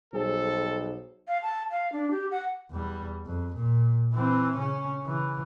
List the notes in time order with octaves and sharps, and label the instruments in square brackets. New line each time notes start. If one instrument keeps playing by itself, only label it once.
[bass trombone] B1 [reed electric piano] G3 G#4 [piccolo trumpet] A4 [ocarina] C5
[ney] F5
A5
F5
D4
G4
F#5
[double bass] E2 G3
F2
A#2
E3 C4
C#3 C#4
C#3 E3